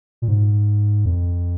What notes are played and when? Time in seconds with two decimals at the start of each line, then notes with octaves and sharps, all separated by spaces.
0.22 A#2
0.28 G#2
1.06 F2